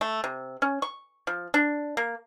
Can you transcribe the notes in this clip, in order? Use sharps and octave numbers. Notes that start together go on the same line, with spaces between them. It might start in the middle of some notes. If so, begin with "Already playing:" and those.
A3
C3
C#4
C#6
F3
D4
A#3